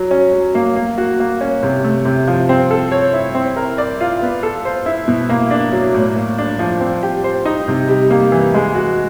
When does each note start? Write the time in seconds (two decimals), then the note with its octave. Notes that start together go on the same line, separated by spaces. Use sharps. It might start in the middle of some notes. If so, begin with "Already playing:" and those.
Already playing: F#3
0.11 C#4
0.33 F#3
0.55 A#3
0.76 A#3
0.98 F#4
1.20 A#3
1.41 C#4
1.63 C3
1.84 A3
2.05 C3
2.28 F3
2.49 C4
2.71 A4
2.91 C#5
3.13 E4
3.35 C4
3.56 A#4
3.78 D5
4.00 F4
4.22 B3
4.43 A4
4.65 C5
4.86 E4
5.08 B2
5.29 A#3
5.51 D4
5.73 F#3
5.94 A2
6.16 A#3
6.38 D4
6.59 F3
6.80 C4
7.03 G4
7.24 C5
7.45 D#4
7.68 C3
7.88 G3
8.10 A#3
8.32 E3
8.54 G#3
8.75 F#4